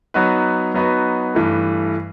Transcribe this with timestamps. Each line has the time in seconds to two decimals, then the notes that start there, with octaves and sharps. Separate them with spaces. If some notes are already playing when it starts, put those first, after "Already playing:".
0.14 F#3 B3 D#4 F#4 B4
0.74 F#3 B3 D#4 F#4 B4
1.35 G2 E3 A3